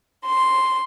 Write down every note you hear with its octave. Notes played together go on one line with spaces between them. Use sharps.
C6